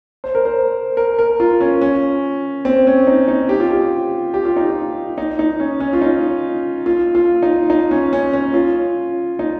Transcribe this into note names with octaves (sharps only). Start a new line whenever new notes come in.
C5
A#4
C5
A#4
A#4
F4
C#4
C#4
C4
C#4
D#4
D#4
G4
F4
G4
G4
F4
D#4
F4
D#4
D#4
C#4
C#4
F4
D#4
F4
F4
D#4
D#4
C#4
C#4
C#4
F4
D#4